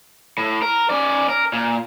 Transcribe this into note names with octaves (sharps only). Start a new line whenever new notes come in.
A2
A#4
C#4 D5
A#4
A#2